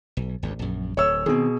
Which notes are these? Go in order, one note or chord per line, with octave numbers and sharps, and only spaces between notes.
B1
G#1 D2
A#1 F#2
D1 C#5 E6
B2 D#3 C4 G#4